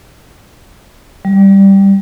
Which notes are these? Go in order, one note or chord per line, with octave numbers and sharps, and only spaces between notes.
G3